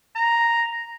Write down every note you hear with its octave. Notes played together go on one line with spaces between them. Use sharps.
A#5